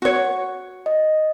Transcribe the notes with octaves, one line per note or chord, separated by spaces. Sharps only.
F#4 C#5
D#5